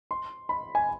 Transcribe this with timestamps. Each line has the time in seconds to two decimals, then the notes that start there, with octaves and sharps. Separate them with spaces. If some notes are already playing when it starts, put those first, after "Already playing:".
0.11 C6
0.49 B5
0.75 G#5